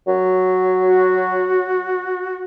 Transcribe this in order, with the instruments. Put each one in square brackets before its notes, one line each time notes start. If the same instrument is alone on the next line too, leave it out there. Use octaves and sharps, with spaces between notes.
[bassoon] F#3
[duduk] F#4